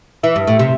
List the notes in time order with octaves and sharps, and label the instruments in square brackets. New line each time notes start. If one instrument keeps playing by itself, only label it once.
[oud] E3 [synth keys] E5
[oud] G2
A2
C3